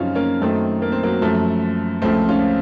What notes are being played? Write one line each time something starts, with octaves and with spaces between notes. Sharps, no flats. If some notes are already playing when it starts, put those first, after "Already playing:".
Already playing: F#2 C#3 F3 C4 C#4 D#4 F4
A#3 C#4
F#2 D#3 A3 C4
A#3
C4
F#3 A#3
F#2 F3 A3
C#2 C#3 F3 A3 C4
C#4 F4